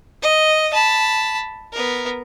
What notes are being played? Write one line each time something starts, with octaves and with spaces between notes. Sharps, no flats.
D#5
A5 B5
B3 A#4